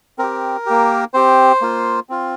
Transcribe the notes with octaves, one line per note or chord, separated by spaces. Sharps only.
C4 G4 A#4
A#3 G4
C4 G4 C5
A#3 F4
C4 F4